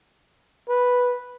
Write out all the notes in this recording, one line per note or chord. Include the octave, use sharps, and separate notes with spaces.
B4